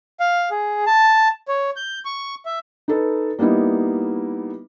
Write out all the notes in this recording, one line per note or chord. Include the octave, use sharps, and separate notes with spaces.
F5
G#4
A5
C#5
G6
C#6
E5
D#4 A4 B4
G3 A#3 B3 D#4 E4